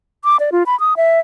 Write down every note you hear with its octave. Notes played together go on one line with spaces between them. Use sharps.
D6
D5
F4
B5
D#6
E5